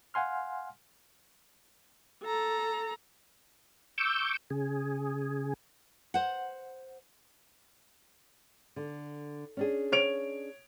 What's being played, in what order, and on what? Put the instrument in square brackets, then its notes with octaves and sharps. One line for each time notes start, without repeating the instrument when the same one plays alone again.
[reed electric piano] F5 F#5 G#5 C6 F6
[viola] A4 A#5
[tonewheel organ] C#6 D6 E6 G6
C#3 G#4
[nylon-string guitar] C5 F#5
D3
C#4 D4 G#4
[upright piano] C#5 D7 F7